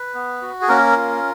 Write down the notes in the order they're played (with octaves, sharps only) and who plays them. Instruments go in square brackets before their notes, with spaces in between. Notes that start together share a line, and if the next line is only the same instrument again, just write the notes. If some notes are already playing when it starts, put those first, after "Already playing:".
Already playing: [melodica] B4
B3
F#4
G#4
A#3 C#4 A#4
F4